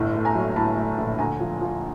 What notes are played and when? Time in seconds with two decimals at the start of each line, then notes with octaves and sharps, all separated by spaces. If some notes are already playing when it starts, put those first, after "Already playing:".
Already playing: G1 A2
0.15 A3
0.25 G#5 A#5
0.35 F#3
0.56 A2 A5 B5
0.77 A3
0.98 A#1
1.19 D2 G#5 A#5
1.40 F3
1.61 F3